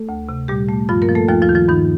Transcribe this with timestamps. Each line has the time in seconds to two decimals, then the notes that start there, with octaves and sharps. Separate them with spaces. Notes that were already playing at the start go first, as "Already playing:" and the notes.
Already playing: A3 A4
0.09 D2
0.29 C3
0.48 A#2 G3 G4
0.69 A3
0.89 G2 F3 F4
1.02 A#3 A#4
1.09 F3
1.15 A3 A4
1.28 D#2 F3 F4
1.42 F3 F4
1.49 D#3
1.55 F3 F4
1.69 G2 D#3 D#4